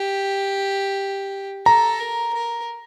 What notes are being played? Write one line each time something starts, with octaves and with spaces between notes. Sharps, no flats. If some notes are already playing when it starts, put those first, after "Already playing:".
Already playing: G4
A4 A#5
A#4
A#4